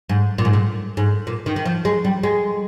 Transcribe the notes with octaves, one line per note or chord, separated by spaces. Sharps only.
G#2
A#2
G#2
A#2
G#2
A#2
D#3
D#3
F3
G#3
G3
G#3